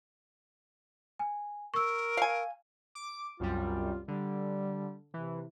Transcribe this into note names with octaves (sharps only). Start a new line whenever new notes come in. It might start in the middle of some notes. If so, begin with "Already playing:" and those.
G#5
A#4 C#6 E6
F5 G#5
D6
C2 F#2 G3 F4
D3 G3
C3 E3